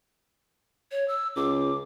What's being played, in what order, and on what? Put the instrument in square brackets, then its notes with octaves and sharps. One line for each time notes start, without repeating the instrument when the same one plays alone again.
[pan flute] C#5
E6
[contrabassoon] C#2 [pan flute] D6